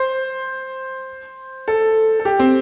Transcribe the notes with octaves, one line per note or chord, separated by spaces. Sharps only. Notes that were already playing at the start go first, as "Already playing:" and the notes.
Already playing: C5
A4
A4
G4
C4